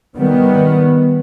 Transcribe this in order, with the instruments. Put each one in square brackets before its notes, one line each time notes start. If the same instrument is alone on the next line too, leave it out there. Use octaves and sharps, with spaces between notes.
[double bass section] D#3 G3 B3